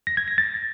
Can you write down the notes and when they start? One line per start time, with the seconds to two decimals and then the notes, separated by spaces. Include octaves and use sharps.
0.07 A#6
0.17 G#6
0.28 A#6
0.38 A6